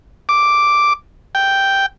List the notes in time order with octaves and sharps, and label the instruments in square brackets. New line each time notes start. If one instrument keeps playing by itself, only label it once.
[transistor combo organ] D6
G5